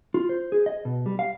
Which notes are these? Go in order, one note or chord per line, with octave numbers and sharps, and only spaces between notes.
F4
C5
G#4
D#5
B2
G3
F5